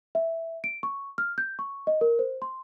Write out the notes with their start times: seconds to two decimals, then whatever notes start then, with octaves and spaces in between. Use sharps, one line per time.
0.15 E5
0.64 D7
0.83 C#6
1.18 F6
1.38 G6
1.59 C#6
1.87 D#5
2.01 A#4
2.19 C5
2.42 C6